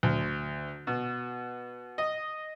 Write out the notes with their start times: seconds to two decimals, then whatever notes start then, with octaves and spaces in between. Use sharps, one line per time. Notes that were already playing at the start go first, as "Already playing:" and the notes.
0.03 D2
0.87 B2
1.98 D#5